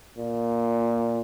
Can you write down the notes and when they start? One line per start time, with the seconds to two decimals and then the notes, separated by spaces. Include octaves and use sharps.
0.18 A#2